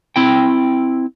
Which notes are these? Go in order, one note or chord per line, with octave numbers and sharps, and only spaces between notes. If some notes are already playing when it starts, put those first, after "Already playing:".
C4 E4 G5